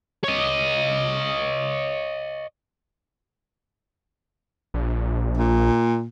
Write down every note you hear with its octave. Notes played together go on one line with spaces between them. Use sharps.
C#5 D#5
A#1
A#2